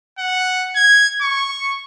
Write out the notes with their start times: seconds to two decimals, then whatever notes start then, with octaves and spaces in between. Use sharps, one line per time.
0.19 F#5
0.76 G#6
1.22 C#6